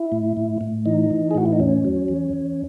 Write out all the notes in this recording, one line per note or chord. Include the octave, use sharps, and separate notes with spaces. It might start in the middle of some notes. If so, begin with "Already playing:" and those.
Already playing: E4
A2
A2
A2
E3 D#4
E3
G#4
A2 F#4
E4
D#4
E2 C#4
F#3
E2
E2